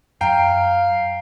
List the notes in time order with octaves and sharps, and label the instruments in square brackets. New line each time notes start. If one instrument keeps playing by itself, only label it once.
[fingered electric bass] F#2 [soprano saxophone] F5 [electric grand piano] G5 D7 [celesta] A#5